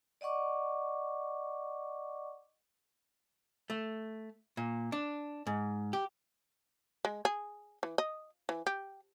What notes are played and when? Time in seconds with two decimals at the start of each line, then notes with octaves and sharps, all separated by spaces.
0.21 D5 D#5 F#5 C#6 D6
3.70 A3
4.57 A#2
4.92 D4
5.47 G#2
5.93 G4
7.05 G#3
7.25 G#4
7.83 E3
7.98 D#5
8.49 E3
8.67 G4